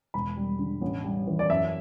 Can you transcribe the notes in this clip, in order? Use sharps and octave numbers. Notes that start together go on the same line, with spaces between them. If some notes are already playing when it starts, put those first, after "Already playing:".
E1 B5
G3
D3
A1
G3
E3
D5
F#2 E5